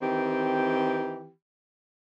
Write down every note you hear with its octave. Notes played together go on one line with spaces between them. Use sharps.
D#3 E3 C4 G4